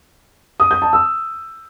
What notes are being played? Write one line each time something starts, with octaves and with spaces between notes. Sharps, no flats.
D#6
G6
A5
E6